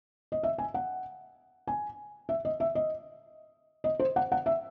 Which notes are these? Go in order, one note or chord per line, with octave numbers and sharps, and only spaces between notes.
D#5
E5
G#5
F#5
G#5
E5
D#5
E5
D#5
D#5
C5
F#5
F#5
E5